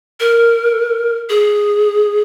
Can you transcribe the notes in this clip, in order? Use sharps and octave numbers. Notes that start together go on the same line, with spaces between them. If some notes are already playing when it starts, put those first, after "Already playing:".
A#4
G#4